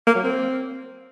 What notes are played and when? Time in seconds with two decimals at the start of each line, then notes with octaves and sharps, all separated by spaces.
0.07 A#3
0.15 F#3
0.24 C4